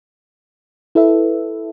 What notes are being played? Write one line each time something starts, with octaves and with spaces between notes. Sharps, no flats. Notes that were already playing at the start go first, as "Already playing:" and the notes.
E4 A4 B4 E5